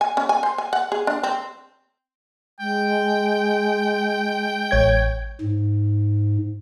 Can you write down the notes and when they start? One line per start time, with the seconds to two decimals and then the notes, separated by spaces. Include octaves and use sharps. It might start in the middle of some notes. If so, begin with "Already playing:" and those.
0.01 G#5
0.17 C#4
0.29 G#5
0.43 C5
0.58 G#5
0.73 F#5
0.92 G#4
1.07 D4
1.23 C4
2.60 G#3 G5
4.71 A1 C#5 G#6
5.41 G#2